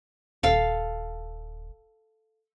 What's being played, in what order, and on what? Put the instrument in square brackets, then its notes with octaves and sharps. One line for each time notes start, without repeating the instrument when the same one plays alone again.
[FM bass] D#1 [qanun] A4 F5